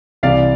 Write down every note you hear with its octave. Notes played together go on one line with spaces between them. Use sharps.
C2 C3 E3 D5 F5